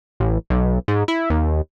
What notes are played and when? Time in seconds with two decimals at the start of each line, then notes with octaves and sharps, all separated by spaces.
0.20 A1
0.50 B1
0.88 G#2
1.08 E4
1.30 D#2